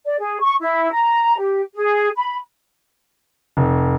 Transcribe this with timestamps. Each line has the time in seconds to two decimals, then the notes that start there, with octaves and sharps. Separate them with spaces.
0.05 D5
0.18 G#4
0.41 C#6
0.60 E4
0.91 A#5
1.37 G4
1.74 G#4
2.16 B5
3.57 F1